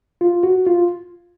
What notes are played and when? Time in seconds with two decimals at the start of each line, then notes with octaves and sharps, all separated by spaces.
0.21 F4
0.43 F#4
0.66 F4